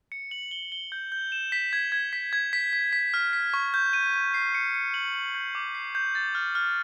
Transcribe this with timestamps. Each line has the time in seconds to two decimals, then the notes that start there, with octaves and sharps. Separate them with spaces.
0.12 C#7
0.31 F#7
0.51 G7
0.72 G7
0.92 G6
1.12 G6
1.32 E7
1.52 B6
1.73 G#6
1.92 G#6
2.13 B6
2.33 G#6
2.53 B6
2.73 B6
2.93 B6
3.14 F6
3.33 B6
3.54 C#6
3.74 G6
3.93 D#7
4.14 G6
4.34 C7
4.55 C#7
4.75 C#7
4.94 F#7
5.14 F#7
5.35 G6
5.55 D6
5.75 C7
5.95 G6
6.15 A6
6.35 F6
6.55 F6